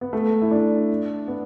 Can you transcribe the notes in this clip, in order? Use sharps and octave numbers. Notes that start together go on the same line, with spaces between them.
B3
A3
E4
D4
B3